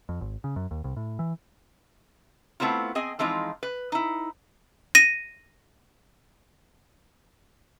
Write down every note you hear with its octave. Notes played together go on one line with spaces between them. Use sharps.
F2
G#1
C#3
F#2
D#2
C2
A2
E3
A3 B3 C4 E4 F4
C4 G#4 D#5 G#5
E3 F3 G#3 C4 D#4 F4
B4
D#4 E4
A#6 D#7